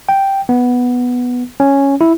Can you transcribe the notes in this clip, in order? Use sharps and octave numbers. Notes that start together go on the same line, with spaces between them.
G5
B3
C#4
E4